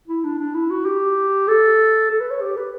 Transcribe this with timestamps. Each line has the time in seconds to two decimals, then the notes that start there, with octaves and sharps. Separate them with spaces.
0.08 E4
0.24 D4
0.39 D4
0.55 E4
0.70 F#4
0.86 G4
1.48 A4
2.11 A4
2.20 B4
2.31 C#5
2.42 G4
2.57 B4